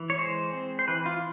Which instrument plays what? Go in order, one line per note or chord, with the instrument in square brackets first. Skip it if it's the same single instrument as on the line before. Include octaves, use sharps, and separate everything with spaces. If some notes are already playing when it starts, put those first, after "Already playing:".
Already playing: [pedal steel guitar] E3
C#5
G#3 C5
C4
C5
E3 B4
F4